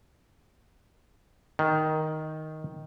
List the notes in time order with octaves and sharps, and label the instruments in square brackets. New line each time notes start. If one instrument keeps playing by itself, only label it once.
[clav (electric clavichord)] D#3